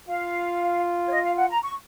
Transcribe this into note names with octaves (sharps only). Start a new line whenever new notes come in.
F4 F5
C#5
D#5
F5
F#5
A#5
C#6